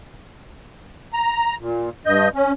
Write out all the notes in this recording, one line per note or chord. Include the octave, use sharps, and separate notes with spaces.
A#5
A#2
G2 D#5 G6
C#4